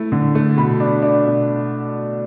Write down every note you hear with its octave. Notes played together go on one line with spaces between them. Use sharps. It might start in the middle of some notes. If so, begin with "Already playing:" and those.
Already playing: A3 E4
D3
A3
B2 B5
D4
D4
B2